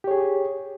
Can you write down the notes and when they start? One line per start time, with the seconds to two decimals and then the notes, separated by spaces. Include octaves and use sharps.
0.04 G4
0.08 C#5
0.11 G#4